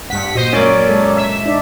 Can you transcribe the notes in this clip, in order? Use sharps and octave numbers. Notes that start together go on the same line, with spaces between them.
G2 F#5 B6
A#2 F#4 C5 D#5
F#2 A#3 C#4 D5
G#3 A4
E5
D4 D#4 D5